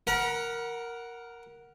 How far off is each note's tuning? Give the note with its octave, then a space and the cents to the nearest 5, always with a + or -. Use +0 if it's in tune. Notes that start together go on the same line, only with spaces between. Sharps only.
A#4 +0 F#5 +0 B5 -45